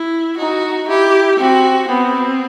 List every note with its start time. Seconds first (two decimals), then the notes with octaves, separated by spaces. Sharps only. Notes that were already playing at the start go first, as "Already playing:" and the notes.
Already playing: E4
0.38 D#4 F#4
0.88 E4 G4
1.39 C4 F#4
1.88 B3 C4